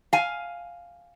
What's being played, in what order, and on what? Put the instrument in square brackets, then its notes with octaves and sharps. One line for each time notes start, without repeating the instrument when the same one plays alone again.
[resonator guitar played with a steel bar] F5 G#5